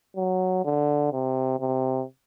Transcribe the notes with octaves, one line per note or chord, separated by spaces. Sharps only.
F#3
D3
C3
C3